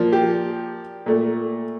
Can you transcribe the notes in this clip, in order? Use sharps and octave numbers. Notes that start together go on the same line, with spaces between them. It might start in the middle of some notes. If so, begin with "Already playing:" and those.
Already playing: A#2 F3 A#3
G4
A#2 A3